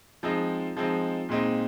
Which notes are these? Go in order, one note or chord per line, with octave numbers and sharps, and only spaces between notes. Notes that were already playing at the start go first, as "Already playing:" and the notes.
F3 G#3 C4 D#4
F3 G#3 C4 D#4
A#2 G#3 C4 D#4